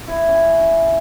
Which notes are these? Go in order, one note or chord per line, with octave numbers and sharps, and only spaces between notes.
E4
C#4